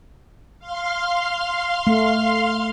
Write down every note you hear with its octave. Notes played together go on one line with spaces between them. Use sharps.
F5 C6 F6
A3